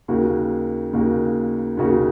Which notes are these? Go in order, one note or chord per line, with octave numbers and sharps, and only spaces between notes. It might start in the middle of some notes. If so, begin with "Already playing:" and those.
D#2 C#3 A#3 F#4
D#2 C#3 A#3 F#4
D#2 C#3 A#3 F#4